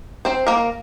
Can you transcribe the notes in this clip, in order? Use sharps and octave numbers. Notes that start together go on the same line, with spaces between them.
C4 C5
A#3 A#4